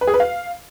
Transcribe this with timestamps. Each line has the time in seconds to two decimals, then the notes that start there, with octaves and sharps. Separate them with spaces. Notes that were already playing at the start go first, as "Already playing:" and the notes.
0.01 B4
0.07 G#4
0.14 B4
0.20 F5